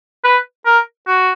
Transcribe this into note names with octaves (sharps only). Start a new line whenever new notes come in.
B4
A#4
F#4